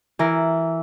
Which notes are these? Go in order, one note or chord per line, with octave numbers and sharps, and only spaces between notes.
E3 A#4